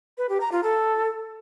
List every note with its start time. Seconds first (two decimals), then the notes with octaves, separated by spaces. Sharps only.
0.18 B4
0.29 G4
0.41 A#5
0.52 F4
0.63 A4